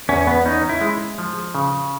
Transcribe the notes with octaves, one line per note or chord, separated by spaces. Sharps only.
E2 C#4
B3
C#4 D#4
E4
G#3
F3
C#3